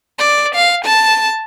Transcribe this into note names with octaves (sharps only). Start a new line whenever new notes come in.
D5
F5
A5